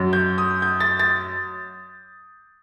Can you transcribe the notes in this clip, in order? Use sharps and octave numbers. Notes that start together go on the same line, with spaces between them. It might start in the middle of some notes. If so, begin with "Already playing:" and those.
Already playing: F#2 F#3
G6
D#6
G6
A6
A6